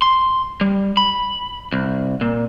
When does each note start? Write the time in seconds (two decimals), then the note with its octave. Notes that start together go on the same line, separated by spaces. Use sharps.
0.02 C6
0.61 G3
0.97 B5
1.72 C2
2.21 A#2